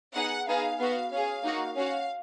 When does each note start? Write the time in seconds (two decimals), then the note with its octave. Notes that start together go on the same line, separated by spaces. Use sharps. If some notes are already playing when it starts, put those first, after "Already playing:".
0.14 B3 D#4 G#4 F#5
0.47 B3 D#4 G#4 F5
0.79 B3 F#4 F5
1.11 C#4 G#4 F5
1.43 A#3 D#4 F#4
1.76 C#4 F#4 F5